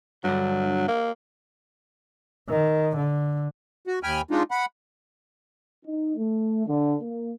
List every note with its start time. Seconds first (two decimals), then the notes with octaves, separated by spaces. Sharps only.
0.24 G2 D3 F#3
0.88 A#3
2.49 D#3
2.96 D3
3.87 F#4
4.03 D#2 G5 G#5 B5 F6
4.31 G#3 D4 D#4 F4
4.51 F#5 B5
5.85 D#4
6.16 A3
6.67 D3
7.02 A#3